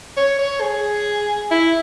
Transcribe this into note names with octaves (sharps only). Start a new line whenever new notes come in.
C#5
C#5
G#4
E4